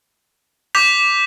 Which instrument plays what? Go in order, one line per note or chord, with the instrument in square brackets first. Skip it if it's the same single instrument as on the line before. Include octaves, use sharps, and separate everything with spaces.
[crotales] D6 G6 B6 F7